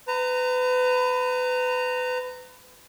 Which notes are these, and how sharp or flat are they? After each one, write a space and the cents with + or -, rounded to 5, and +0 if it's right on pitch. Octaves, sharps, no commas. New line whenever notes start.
B4 +30 A#5 -20